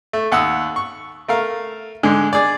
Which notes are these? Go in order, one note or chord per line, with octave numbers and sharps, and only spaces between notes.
A3
D#2 F#5 D#6 E6
C#6
A3 A#4 F5
G#2 D3 G#3
G#4 D5